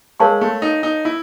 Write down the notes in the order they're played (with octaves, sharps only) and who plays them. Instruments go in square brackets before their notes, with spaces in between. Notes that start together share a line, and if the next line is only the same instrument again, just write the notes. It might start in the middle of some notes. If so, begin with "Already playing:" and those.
[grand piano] G#3 [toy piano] A#4 C#5 F5 A5 C#6
[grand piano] A3
D#4
D#4
E4